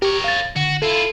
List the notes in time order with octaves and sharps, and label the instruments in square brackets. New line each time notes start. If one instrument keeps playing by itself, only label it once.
[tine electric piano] G4 [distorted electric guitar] A#4 C#5
[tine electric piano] F5 A6
[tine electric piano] D3 [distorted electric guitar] F#4
[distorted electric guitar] E4 F4 [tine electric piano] A4